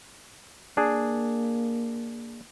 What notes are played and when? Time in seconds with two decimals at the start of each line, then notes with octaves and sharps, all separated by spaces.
0.77 A#3 D4 G#4